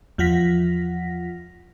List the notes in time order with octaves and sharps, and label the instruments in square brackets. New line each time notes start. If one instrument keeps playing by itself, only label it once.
[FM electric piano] E2 F3 F4 F#5 A#6 B6